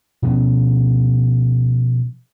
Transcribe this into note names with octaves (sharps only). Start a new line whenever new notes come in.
B2 F3 B3 C#4